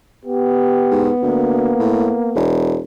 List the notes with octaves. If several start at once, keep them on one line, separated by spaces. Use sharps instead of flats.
B3 G4
G#2
D2 A#3
A2
E1